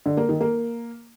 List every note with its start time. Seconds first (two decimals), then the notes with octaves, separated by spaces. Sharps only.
0.06 D3
0.17 A#3
0.29 D#3
0.41 A#3